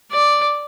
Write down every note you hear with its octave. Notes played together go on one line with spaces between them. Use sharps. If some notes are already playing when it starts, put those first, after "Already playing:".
D5